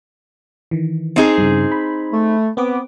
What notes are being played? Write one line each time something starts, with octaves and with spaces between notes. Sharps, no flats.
D#3 E3
C4 D#4 G#4
G2 C#3
B5
A3
B3 C4 B4 D6